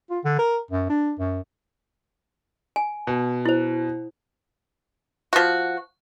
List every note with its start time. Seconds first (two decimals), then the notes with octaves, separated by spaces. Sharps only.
0.10 F4
0.25 D3
0.39 A#4
0.71 F#2
0.89 D4
1.19 F#2
2.76 G#5
3.07 B2
3.45 E4 C5
5.33 F3 F#4